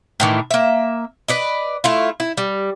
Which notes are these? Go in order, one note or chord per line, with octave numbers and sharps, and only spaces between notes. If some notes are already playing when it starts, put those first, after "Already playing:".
A2 D#3 E3
A#3 E5
B4 D5 D#5
A3 E4 F4
E4
G3